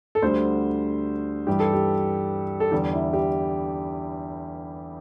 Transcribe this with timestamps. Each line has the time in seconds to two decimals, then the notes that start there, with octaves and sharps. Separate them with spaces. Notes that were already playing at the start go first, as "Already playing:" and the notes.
0.15 A4
0.22 D2 D3 G3 C5
1.47 G2 E3 G3 G4
1.60 A4
1.73 G4
2.60 A4
2.72 E2 D3 G3 G4
2.93 E4
3.13 G4